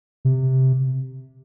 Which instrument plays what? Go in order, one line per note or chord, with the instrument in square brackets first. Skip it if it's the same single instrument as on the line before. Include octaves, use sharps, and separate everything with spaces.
[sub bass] C3